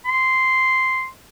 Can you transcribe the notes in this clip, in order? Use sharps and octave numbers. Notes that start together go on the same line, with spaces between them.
C6